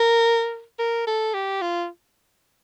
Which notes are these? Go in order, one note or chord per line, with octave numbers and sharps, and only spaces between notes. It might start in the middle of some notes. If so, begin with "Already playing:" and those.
Already playing: A#4
A#4
A4
G4
F4